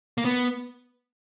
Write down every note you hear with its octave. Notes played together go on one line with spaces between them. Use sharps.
A#3
B3